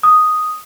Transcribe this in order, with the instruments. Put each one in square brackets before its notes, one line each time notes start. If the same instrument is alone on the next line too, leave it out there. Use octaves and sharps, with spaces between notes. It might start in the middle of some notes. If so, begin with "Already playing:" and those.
[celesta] D#6